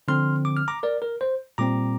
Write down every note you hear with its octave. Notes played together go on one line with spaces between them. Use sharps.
D3 F3 C4 C6 F6
D6
F6
A#5 D6
A#4 D5
A#4
C5
A#2 G3 C4 A#5 D6